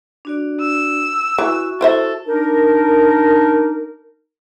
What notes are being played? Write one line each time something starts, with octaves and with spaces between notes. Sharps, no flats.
D4 F#4 D5
E6
E3 F#4 C#6
E4 A4 C5 E5
D4 D#4 A#4